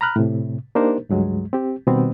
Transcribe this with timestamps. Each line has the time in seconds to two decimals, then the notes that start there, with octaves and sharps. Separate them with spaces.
0.01 A#5 B5 F6 F#6
0.16 A2 C3
0.75 A#3 D4 D#4 G4 A#4 C5
1.09 C#2 G2 F#3 G#3
1.53 C4 G4
1.87 B2 D#3 G3 B3 C4